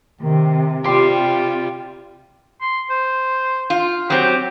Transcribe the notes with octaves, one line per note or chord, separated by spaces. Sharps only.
C3 D#3
C3 G3 C4 F4 G4 C6
C6
C5
F4
F#3 C4 G4